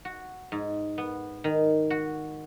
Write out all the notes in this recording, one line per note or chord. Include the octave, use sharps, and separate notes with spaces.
F#4
G#2
B3
D#3
F#4